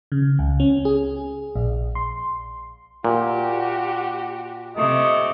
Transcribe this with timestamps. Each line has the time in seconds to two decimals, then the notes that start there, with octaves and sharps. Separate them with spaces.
0.12 C#3
0.39 C#2
0.60 C#4
0.85 G#4
1.55 A#1
1.95 C6
3.04 A#2 F#4 G4
4.77 C3 A3 D#5